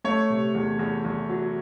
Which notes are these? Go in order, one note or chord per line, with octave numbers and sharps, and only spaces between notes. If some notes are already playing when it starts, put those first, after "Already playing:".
A3 C#5
C3
E2
E2
E2
F#3